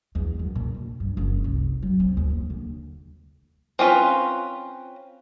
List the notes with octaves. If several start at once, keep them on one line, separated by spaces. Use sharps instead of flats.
E2
F#2
A#2
D#3
G2
F#1
C2
F#3
C4
D#2
A#3
D3
C4 C#4 F4 B4